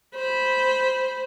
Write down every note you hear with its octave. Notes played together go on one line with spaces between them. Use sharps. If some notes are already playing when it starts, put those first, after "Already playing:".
C5 B5